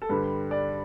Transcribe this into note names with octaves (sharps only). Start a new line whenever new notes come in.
A4
G2 D3 G3 B4
D5